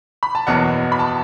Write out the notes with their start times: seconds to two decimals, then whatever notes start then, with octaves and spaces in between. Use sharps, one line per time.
0.23 B5
0.35 A5
0.47 F#1 E2 B2 F#3 F#5
0.92 B5
0.99 A5